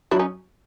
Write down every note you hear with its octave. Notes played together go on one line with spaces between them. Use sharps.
F#3 D4 E4
C#4 D#4